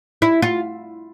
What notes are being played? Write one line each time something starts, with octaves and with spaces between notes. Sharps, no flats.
E4
F4